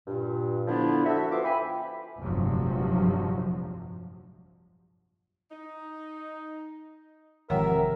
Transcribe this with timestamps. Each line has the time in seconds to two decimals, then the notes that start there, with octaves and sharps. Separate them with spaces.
0.07 G2 A#2
0.67 D3 F3 B3 D4 E4
1.04 F#4 A4 E5
1.32 B3 F4 C5 D6
1.45 E5 G5 G#5 B5
2.19 F1 A#1 G2 C3 F3 F#3
5.51 D#4
7.50 G#1 F2 C3 A#4 C#5 E5 F#5 G5